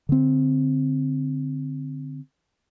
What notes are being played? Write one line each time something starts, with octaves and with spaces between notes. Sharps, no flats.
D3 C4